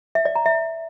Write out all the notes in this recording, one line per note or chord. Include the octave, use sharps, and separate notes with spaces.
E5
D5
A#5
E5